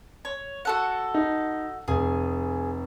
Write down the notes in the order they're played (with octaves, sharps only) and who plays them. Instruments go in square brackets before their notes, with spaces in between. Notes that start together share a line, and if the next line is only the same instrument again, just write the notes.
[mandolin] C#5
F#4 A4 F#5
[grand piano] D#4
[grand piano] F1 [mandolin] G#4